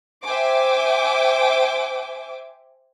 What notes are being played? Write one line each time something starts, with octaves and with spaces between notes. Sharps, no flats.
C5 E5 G5 G#5 D6